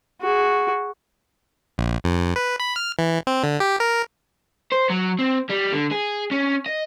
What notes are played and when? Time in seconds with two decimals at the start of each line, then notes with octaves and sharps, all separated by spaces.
0.22 F#4 G#4
1.78 A#1
2.04 F2
2.36 B4
2.60 B5
2.76 F6
2.99 E3
3.27 C4
3.43 D3
3.60 G4
3.80 A#4
4.72 C5
4.90 F#3
5.19 C4
5.49 G3
5.72 D3
5.91 G#4
6.31 C#4
6.66 D#5